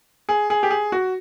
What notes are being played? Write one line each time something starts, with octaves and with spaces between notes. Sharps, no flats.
G#4
G#4
G4
G#4
F#4